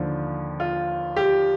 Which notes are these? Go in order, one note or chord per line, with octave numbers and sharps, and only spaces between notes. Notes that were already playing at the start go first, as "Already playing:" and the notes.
Already playing: D#2 D3 F3
F4
G4